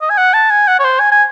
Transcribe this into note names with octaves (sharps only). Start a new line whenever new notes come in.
D#5
G#5
F#5
A5
G#5
F#5
C#5
C5
G#5
G#5